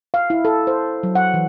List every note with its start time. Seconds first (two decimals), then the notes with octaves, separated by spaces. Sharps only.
0.14 F5
0.30 E4
0.45 A4
0.67 C5
1.03 F#3
1.15 F#5
1.34 E3